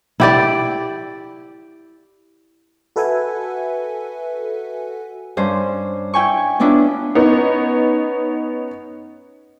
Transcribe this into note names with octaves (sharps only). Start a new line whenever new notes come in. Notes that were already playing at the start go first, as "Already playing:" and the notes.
E4 G4 D5
F#4 A4 B4 E5 F#5 G#5
G2 C#4 C5
E4 G5 G#5 C#6
B3 C#4 D4 E4 F4
B3 C#4 D#4